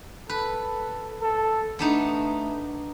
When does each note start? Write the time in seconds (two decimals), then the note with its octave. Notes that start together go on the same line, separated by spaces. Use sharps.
0.29 A4 B4
1.22 A4
1.79 A3 B3 D4 D#4